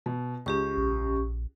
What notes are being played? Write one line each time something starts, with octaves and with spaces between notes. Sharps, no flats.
B2
C#2 C#4 G4 C#6
A#1